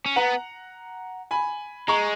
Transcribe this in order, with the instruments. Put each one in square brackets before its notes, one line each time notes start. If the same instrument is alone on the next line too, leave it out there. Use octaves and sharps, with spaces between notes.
[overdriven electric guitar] C#4
[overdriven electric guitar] B3 [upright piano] F#5 A#5
[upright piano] G#5 B5
[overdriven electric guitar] G#3 [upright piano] A#5 C#6